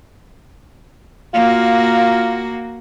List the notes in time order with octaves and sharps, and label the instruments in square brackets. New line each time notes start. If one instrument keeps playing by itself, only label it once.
[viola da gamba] A#3 F#4 [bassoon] F4